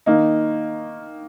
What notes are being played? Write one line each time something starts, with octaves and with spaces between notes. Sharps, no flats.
D#3 A#3 D#4